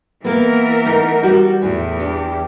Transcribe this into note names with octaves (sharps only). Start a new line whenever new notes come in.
E3 A#3 B3 A#4
A3 D#4 F#5
G3 F#4
E2 A2 E3
D4 G4